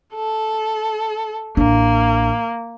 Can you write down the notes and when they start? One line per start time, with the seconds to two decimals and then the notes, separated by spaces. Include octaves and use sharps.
0.14 A4
1.57 A1 A#3 D4